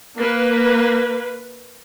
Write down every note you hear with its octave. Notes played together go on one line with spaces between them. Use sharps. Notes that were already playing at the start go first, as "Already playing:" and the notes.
A#3 B4